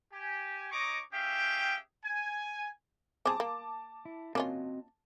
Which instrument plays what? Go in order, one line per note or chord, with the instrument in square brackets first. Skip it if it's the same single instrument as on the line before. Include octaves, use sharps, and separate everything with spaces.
[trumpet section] G4 G#5
D#4 C#5 D#5 A#5 C#6 D6
C#4 G4 G#4 E5 F5 G5
G#5
[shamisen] C4 G#4 [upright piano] A5 D6
[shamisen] A#3
[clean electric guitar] E4
[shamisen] A#3 C#4 F4 [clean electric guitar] C4 F#4 D#5